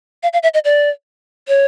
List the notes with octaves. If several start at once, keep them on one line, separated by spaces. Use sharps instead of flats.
F5
F5
E5
D#5
D5
C#5